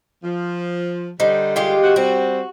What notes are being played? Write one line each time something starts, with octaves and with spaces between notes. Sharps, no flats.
F3
D3 G3 D#4 C5
G#3 F4 G4
C4 F#4
G3 C4 F#4